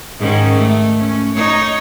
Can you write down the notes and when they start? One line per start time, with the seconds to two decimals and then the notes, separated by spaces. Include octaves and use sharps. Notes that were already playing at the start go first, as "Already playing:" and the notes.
0.19 G#2 D#3 C#4
0.57 A3
0.97 C#4
1.35 D#4 C#5